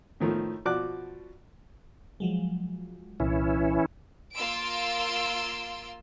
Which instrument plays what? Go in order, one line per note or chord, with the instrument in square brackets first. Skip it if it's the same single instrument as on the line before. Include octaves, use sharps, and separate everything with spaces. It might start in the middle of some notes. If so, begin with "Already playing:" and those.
[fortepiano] A2 D#3 F3 A3
B2 F3 F#4 D5 D6 F#6
[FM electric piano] F3 F#3 G#3
[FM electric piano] C2 A#2 [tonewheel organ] E3 C#4 E4
[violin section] A#3 F4 C6 E6 D7